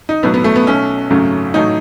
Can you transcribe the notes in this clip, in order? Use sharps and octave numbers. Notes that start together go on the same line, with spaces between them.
D#4
B1 A2 F#3 B3
B3
A3
B3
B1 B2 A3 C#4
G#1 F#2 C#3 F#3 A3
A1 A2 F#3 A3 D#4